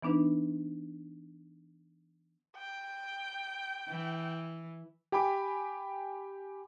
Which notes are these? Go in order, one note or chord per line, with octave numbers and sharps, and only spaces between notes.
E3 B3 D4 D#4 B4
G5
E3
G4 G5 G#5 B5 D6